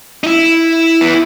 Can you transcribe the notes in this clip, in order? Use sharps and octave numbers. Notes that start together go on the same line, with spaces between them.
D#4
E4
B3